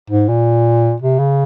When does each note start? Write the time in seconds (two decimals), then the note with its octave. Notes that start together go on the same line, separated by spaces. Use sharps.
0.10 G#2
0.29 A#2
1.01 C3
1.19 C#3